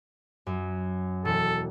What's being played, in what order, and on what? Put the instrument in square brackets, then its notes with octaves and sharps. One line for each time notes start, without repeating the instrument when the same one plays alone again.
[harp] F#2
[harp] E1 [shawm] A4